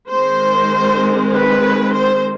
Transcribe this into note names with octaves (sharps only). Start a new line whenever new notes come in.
D#3 G#3 C4 C5
B4
C5